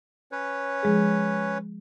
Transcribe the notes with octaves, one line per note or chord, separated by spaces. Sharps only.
C#4 B4 C#5
F3 G#3 G#4